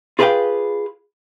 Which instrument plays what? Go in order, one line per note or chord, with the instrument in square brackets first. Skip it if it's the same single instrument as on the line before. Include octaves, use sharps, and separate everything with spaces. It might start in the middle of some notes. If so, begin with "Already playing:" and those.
[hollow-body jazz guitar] F4 G#4 B4 D#5 F5 G5